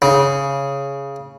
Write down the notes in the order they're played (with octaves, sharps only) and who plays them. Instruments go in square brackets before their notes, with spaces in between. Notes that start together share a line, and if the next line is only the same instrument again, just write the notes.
[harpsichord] C#3